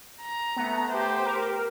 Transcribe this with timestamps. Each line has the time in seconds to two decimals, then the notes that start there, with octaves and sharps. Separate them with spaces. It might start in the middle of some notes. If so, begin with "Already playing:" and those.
0.22 A#5
0.56 A3 B3
0.90 G4 C5
1.25 A#4